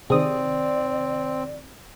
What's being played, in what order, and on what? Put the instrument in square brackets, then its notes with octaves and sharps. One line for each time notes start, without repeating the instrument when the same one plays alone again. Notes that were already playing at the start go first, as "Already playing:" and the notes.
[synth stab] C3 D#3 [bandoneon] C4 [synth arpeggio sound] G#4 D#6 [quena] D5